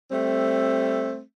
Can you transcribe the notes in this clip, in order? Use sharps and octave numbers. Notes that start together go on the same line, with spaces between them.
G3 A3 C4